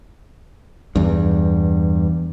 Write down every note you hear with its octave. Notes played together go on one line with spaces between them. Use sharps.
E2 G2